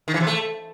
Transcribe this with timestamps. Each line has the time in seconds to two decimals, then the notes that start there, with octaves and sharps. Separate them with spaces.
0.08 D#3
0.14 E3
0.20 C3
0.27 A3